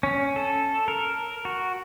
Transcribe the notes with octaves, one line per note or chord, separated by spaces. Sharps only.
C#4
A4
A#4
F#4